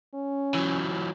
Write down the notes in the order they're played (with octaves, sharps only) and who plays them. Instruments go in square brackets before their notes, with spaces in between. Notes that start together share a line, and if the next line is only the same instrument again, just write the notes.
[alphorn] C#4
[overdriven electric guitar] E3 F#3